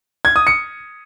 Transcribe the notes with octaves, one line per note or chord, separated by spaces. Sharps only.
G#6
D#6
C#7